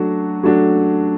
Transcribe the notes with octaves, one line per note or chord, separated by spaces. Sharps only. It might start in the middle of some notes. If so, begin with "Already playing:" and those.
Already playing: F#3 A3 D4 F#4
F#3 A3 D4 F#4